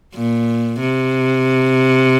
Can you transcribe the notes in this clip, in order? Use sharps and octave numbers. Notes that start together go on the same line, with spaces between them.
A#2
C3